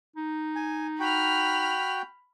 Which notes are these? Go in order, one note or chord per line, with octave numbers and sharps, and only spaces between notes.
D#4
G#5
F#4 G5 B5 F6